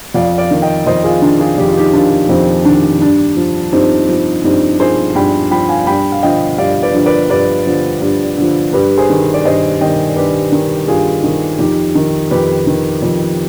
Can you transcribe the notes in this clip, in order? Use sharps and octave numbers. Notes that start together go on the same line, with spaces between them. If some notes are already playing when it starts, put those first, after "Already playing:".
F2 D5 F5
D5 F5
D#3
D#5 G5
F2 C5 D#5
F4 G#4
D#3 D4 F4
F4 G#4
F2 G4
F4
D#4 G4
D#3 D4 F4
F2 C4 D#4
D#3 D4
G2 D4
F3
G2 C4 D#4
F3
G2 C4 D#4
F3 G#4 C5
G2 G5 B5
F3 G5 B5
F5 G#5
G2 G5 B5
F5
D3 F3 D#5 G5
G2 D5 F5
B4 D5
D3 F3
B4 D5
G2 B4 D5
D3 F3
G2
D3 F3
G2 G4 B4
G#4 C5
D#3
D5
G2 C5 D#5
D#3 D#5 G5
G2 G4 B4
D#3
G2 F4 G#4
D#3
F2 D#4 G4
D#3
F2 G4 B4
D#3
F2